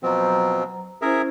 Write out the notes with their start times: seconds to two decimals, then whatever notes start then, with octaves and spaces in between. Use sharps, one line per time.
0.03 B2 F3 F#3 C4 A#5
1.02 C#4 E4 G#4 A#4 C5 E5